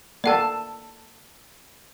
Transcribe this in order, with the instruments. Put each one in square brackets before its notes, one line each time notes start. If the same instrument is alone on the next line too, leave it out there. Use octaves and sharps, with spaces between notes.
[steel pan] A#3 A4 [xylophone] D5 F#5 A5